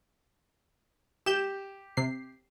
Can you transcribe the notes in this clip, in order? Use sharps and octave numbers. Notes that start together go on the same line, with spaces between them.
G4 G6 E7
C3 C7